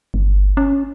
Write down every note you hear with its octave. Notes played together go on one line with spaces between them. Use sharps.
G1
C#4